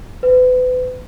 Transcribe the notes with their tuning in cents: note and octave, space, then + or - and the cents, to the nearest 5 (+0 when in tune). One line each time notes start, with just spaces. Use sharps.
B4 +35